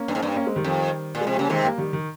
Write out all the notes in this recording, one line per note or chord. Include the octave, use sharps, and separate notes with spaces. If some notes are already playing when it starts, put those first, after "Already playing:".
Already playing: A#3 C#4
G2
G#2
G2
A#3 C#4
G#3 C4
D#3 G3
F2
A#2
F3 G#3
C3
C#3 G3 A#3
C3 D#3 G#3 C4
G3 A#3
D#3 G3
D#3